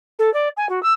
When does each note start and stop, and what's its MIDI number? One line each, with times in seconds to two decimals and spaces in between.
0.19 0.32 69
0.34 0.48 74
0.57 0.68 80
0.69 0.82 66
0.83 0.93 88